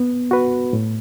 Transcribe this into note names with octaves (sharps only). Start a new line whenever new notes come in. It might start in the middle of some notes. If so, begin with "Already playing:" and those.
Already playing: B3
F#4 B4
A2